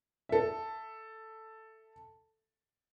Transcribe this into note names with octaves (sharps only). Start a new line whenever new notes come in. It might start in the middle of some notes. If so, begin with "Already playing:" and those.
A4 E5